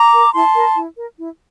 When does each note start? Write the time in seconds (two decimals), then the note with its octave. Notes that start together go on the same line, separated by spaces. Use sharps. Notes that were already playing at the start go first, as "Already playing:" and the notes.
Already playing: A#5 D6
0.12 A#4
0.33 E4 A5 C6
0.54 A#4
0.76 E4
0.96 A#4
1.18 E4